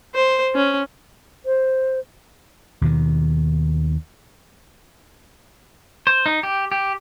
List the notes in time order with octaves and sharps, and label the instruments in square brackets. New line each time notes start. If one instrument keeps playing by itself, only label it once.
[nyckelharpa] C5
C#4
[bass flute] C5
[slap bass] D#2 B2 D#3
[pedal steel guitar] C5
D#4
G4
G4